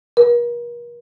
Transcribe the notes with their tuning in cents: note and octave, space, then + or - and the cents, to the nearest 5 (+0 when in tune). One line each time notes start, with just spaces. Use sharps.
A#4 +40